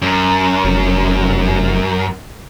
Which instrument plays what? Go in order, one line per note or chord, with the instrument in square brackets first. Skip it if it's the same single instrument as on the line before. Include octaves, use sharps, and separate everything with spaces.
[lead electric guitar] F#2
[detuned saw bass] F1